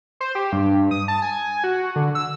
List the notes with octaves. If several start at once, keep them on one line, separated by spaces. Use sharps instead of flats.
C5
G4
G2
D#6
A5
G#5
F#4
D3
E6